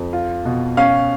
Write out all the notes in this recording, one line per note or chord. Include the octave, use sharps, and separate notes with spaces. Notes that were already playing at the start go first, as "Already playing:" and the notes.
Already playing: F2
F4
B2
C#4 F5